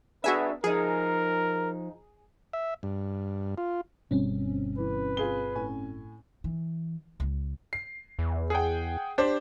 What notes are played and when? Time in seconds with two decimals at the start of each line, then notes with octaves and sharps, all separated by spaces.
0.24 B3 D4 F#4 G#4 B4 E5
0.64 F3 D#4 G#4 A#4
2.53 E5
2.83 G2
3.58 F4
4.11 G1 B2 G3 C4 C#4
4.78 E3 B4
5.17 F4 G#4 G7
5.55 A2 G#5
6.44 E3
7.20 C#2
7.73 C7
8.19 E2
8.50 G#4 F#5 G5
9.18 D4 G4 C5